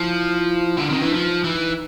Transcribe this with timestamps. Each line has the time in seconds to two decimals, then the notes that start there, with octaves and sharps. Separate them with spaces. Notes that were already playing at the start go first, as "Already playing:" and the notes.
Already playing: F3 E4
0.77 D3
0.90 D#3 C4
0.97 C#4
1.02 E3 D4
1.13 F3 D#4
1.44 E3